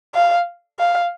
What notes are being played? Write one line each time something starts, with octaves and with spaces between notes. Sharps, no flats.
F5
F5